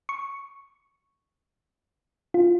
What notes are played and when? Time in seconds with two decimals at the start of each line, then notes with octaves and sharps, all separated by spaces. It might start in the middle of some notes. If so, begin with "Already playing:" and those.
0.09 C#6
2.34 F4